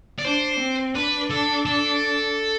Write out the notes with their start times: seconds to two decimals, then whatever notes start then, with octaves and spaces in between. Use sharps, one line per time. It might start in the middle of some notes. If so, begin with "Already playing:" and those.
0.19 D5
0.25 D4 C5
0.60 C4
0.95 D4 B4
1.30 A4
1.65 A4